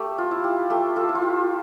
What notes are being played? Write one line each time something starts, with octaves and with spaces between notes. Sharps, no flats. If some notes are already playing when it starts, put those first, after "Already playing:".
Already playing: A3 G4
F4
E4
G4
A3 G4
F4 A4
E4
F4
G4